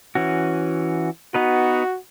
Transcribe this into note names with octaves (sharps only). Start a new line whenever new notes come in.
E3 C#4 F#4
B3 D#4 F#4 B4